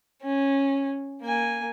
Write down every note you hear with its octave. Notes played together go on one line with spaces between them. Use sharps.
C#4
A#3 G#5